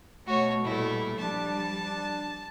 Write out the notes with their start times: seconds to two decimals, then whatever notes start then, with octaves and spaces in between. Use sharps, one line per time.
0.27 B2 A3 F#4 C#5
0.64 A#2 G3 A3 E4
1.19 F3 G3 D4 A5
1.78 D4